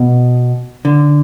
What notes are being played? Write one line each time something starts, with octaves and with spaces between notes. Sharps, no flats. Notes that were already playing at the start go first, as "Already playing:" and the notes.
Already playing: B2
D3